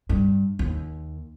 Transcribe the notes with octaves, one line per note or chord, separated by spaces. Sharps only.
G2
D#2